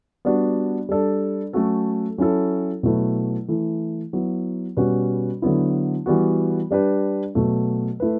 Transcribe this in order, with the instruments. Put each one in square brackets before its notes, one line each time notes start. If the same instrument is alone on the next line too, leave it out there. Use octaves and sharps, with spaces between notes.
[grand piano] G3 B3 D4 F#4
G3 D4 A4
F#3 A3 C#4 F#4 A4
F#3 C#4 E4 A4
B2 F#3 A3 E4 B4
E3 A3 E4
F#3 B3 E4
B2 G3 C#4 F#4 B4
D3 F#3 B3 E4
E3 G3 B3 F#4
G3 D4 G4 B4
B2 F#3 A3
A3 E4 B4